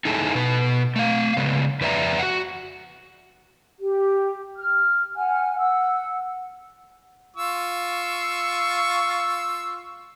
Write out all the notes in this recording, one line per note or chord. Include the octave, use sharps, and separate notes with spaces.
D#4 E4 G#4 A4
B2 B4
A3 F5
C#3 G#3 B3
F2 B4 D5 E5 A#5
F#4 F#5
G4
F6
F#5 G#5 F6
F#5 E6
F4 C#6 E6